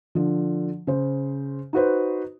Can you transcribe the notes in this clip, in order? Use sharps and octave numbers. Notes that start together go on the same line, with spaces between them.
D3 F3
C#3 C5
D#4 F#4 B4 C5